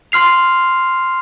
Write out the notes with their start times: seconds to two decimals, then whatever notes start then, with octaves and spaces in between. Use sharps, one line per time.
0.12 C6 F6 C7 F7